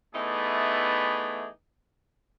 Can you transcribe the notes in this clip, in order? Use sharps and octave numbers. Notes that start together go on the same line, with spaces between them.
E3 A3 B3 D#4 G#4 D5